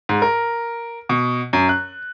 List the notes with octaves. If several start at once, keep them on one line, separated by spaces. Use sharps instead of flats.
G#2
A#4
B2
F#2
F#6